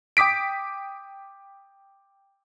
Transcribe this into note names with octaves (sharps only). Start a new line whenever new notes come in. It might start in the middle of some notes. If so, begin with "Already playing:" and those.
G5 D6 D#6 B6 D7